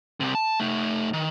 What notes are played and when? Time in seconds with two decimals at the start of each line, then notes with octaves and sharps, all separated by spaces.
0.20 C2 C3
0.35 A5
0.60 A3 D#4
1.13 D#3